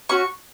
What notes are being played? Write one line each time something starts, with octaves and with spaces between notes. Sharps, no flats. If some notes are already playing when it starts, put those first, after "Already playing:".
C#4 F#4 C#6